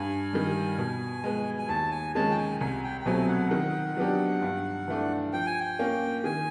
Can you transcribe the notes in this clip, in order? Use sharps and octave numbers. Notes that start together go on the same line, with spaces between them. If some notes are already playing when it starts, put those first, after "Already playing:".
Already playing: G2 G#5
D#3 G3
B2
G#3 B3
G#5
D#2 A5
G#5
D#3 G#3 C#4 A5
G5
G#5
C2 G#5
G5
G5
B2 F#3 A3 C4 G#5
F#5
D#3
F#3 B3 D4 G4
G2
E3 A3 D4
F3 G5
G#5
G5
A#3 C#4
D#3 G#5